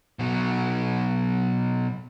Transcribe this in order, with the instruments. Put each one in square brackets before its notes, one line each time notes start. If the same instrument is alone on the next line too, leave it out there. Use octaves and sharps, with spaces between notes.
[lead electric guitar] B2 F#3